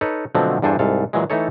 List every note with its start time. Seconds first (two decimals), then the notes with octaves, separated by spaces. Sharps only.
0.01 D#4 A4 B4 C#5
0.35 B2 D3 F3 F#3 A3 C4
0.62 E2 G2 D4 A4 C5 G#5
0.79 C2 G#2 A4 F5
1.13 A#2 E3 F#3 G#3
1.30 E3 A3 D#4 A4 C#5